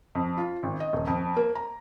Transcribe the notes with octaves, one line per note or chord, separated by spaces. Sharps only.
F2
F4
G#1
D#5
D#1
F2
A#3
A#5